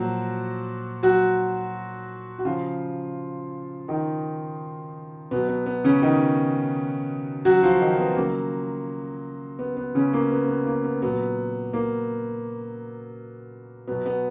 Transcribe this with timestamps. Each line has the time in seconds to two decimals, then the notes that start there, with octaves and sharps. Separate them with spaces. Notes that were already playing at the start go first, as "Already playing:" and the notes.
Already playing: A#2 F3 F#3 F#4
1.03 F#3 F#4
2.39 F#4
2.45 C#3 F3 F4
3.88 D#3 D#4
5.31 B2 F#3 B3
5.48 B3
5.66 B3
5.84 C#3 C#4
6.02 D#3 D#4
7.45 F#3 F#4
7.63 F3 F4
7.81 D#3 D#4
7.99 B3
8.16 C#3 F#3 A#3
9.59 B3
9.77 B3
9.95 C#3 C#4
10.13 A#3
10.31 B3
10.48 B3
10.66 A#3
10.84 B3
11.02 A#2 F#3 B3
11.73 A#3
13.88 B2 F#3 B3
14.06 B3